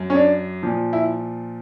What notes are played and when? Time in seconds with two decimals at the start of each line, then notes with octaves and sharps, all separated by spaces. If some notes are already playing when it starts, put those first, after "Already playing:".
Already playing: F#2
0.10 C#4
0.15 D4
0.63 A#2 F3
0.93 E4